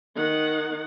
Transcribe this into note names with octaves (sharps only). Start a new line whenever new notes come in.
D#3 F#5